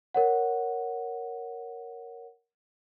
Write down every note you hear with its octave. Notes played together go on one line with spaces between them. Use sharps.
A#4 C#5 F#5